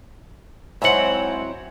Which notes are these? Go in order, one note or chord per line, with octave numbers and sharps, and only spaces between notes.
G#2 F#3 C4 E4 C#5 F#5